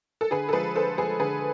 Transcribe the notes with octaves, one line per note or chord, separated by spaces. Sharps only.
A4
D3 G#4 B4
A4
F3 G#3 G#4 B4
D3 A4 C5
F3 G#3 G#4 B4
D3 G#4 B4